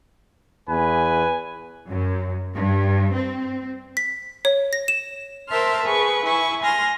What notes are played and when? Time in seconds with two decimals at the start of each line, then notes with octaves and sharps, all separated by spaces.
0.69 E2 B4 G#5
1.89 F#2
2.54 G2
3.14 C4
3.97 B6
4.45 C#5
4.73 A#6
4.88 E7
5.48 A#4 C5 E5 A5 C6 F6
5.84 G#4 B4 C#6
6.24 E4 G#5 C#6
6.62 G#5 C6 F6 A#6